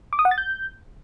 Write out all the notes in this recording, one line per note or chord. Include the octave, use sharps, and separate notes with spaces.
D6
D#6
F#5
A6
G6